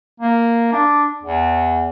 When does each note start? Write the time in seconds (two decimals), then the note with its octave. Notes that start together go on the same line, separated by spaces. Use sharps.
0.20 A#3
0.73 D4
1.23 E2